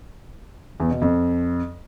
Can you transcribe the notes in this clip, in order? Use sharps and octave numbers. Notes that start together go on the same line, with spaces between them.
E2
B2
F2